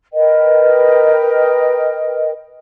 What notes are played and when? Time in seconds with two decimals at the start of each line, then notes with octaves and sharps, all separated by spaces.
0.13 A#4 B4 D#5 G5